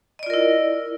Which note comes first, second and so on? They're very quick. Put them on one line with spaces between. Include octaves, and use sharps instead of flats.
D#5 D5 F4 A#4 E4